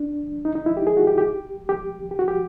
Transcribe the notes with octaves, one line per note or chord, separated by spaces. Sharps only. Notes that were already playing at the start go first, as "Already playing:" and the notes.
Already playing: D4
D#4
D#4
E4
G4
G#4
F#4
G4
G4
G4
G4
F#4
G4